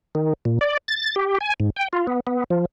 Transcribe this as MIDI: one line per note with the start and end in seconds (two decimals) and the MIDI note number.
0.15 0.33 51
0.45 0.59 46
0.61 0.77 74
0.88 1.15 93
1.16 1.38 67
1.41 1.54 80
1.60 1.70 44
1.77 1.88 79
1.93 2.07 65
2.07 2.20 59
2.27 2.44 59
2.50 2.65 53